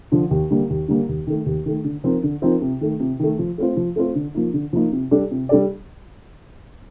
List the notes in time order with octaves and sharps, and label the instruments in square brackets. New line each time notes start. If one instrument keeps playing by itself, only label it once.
[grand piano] D3 F3
D#2
D3 G3 A#3
D#2
D3 G3 A#3
D#2
D#3 A3
D#2
D#3 A3
D3
F3 C4 D#4 A#4
D3
F3 C4 D#4 A#4
C3
D#3 A3
C3
D#3 A3
F3
A3 C4 F4 C5
F3
A3 C4 F4 C5
D3
F3 A#3 D#4
D3
F3 A#3 D#4
C3
G3 D4 A4 D5
C3
G3 D4 A4 D5